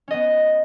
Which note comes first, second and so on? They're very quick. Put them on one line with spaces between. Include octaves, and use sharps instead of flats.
C#4 D#5 B3